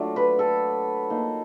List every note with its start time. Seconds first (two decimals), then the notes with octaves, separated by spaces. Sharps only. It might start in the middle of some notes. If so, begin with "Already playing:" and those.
Already playing: F#3 A3 D4 F4
0.16 B4
0.39 A4
1.10 A#3 D#4